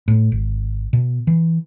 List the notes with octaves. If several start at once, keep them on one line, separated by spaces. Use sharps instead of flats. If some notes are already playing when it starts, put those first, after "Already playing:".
A2
G#1
B2
E3